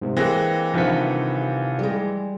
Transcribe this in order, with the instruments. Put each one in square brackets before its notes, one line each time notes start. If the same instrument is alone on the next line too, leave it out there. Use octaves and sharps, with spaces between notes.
[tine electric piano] G#2 C3
[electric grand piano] E3 F#6 A#6 [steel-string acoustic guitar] G#3 G4 [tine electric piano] A#3 C4
[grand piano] G2 D#3 F3 [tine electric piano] C3 F#5 B6
[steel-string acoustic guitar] G3 G#3